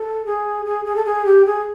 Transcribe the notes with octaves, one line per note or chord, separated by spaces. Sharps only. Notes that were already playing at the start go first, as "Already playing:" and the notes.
Already playing: A4
G#4
G#4
G#4
A4
G#4
G4
G#4